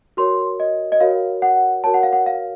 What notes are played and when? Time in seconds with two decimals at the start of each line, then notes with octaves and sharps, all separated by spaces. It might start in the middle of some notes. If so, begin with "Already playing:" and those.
0.17 F#4 A#4 C#5 C6
0.60 D#5
0.92 D#5
1.00 F#4 A#4 C#5 F5
1.42 F#5
1.84 F#4 A#4 C#5 A5
1.94 F#5
2.03 F5
2.13 F#5
2.26 F5